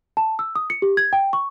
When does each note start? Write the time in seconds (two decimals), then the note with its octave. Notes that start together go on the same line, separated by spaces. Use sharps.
0.17 A5
0.39 E6
0.56 D#6
0.70 C#7
0.82 G4
0.97 G#6
1.13 G5
1.33 C#6